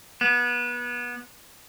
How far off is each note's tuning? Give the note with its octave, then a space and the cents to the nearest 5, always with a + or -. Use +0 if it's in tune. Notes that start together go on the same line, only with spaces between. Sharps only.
B3 -25